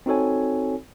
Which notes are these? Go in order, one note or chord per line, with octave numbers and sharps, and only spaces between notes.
C4 D#4 F#4 A4 C#5 G#5